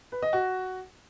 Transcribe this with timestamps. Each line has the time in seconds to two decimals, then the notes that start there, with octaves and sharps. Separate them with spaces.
0.12 B4
0.23 D#5
0.33 F#4